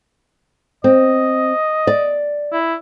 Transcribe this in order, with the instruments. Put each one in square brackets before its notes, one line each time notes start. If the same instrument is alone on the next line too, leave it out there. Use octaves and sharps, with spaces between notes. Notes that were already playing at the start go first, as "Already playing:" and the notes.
[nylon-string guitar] C4 [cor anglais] D#5
[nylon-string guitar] D5
[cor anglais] E4